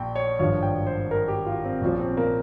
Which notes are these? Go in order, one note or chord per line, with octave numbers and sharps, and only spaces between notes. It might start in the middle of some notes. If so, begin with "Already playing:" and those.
Already playing: A#1 A#2 G5
C#5
G#1 G2 F3 C#5
G5
C5
A#4
G4
F4
C4
A#1 A#2 F3 C#4
C4
A#3